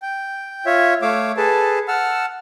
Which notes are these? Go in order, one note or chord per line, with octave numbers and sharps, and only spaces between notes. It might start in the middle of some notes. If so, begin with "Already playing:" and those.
G5
F4 C#5 E5
A3 C#5 F5 D6 E6
G#4 A4 B4 A5
F#5 A5 E6 F6